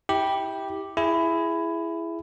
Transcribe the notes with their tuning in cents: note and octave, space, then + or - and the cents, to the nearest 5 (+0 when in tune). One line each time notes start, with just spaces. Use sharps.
E4 -20 G4 +0
E4 +15 G#4 +0